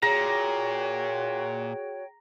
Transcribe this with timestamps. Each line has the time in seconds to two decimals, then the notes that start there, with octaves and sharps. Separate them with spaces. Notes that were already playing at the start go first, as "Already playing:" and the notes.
0.02 A#2 F#4 G#4 C#5 G5 A#5